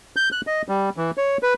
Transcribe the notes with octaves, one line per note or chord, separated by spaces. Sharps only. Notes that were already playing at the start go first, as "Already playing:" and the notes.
G6
F#6
D#5
G3
E3
C#5
B4